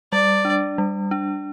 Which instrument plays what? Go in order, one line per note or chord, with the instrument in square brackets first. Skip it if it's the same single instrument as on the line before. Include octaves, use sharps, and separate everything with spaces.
[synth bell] G3 [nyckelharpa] D5
[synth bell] D4
G3
D4